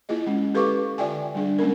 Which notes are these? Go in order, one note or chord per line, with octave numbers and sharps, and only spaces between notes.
A#3 E4 F4 G#4 D#5
G#3 C#4
G4 A4 B4 F5 C#6 D6
D3 F4 D5 E5 G5 G#5
G3 D4 G#4
G#3 A#3 C#4 A#4